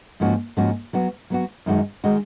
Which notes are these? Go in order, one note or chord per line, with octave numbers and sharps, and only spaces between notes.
G#2 F3 A#3 C#4 F#4
G#2 F3 A#3 C#4 F#4
F#3 B3 F#4
F#3 B3 F#4
F#2 D#3 G#3 D#4 F#4
D#3 G#3 D#4 F#4